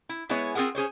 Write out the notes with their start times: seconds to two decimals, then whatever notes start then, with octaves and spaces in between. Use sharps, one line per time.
0.09 E4
0.29 G#3 B3 E4 G#4 B4 C#5
0.55 C4 F4 G#4 A#4 F#5
0.75 C#4 G#4 C5 C#5